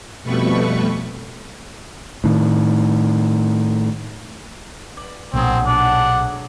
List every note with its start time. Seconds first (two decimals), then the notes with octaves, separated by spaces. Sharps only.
0.23 F2 B2 G3 A3 B4 C#6
2.24 A2 D#3
4.97 D5
5.34 B1 A#2 D3 F#3 C4 G#4
5.67 D4 F#5